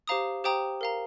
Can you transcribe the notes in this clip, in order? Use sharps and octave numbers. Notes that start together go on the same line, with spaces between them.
G4 C5 F5 A#5 D#6
G4 C5 G5 A#5 D#6
A#4 F5 A#5